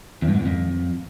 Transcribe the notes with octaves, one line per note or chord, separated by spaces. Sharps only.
E2
G2
G#2
E2
F2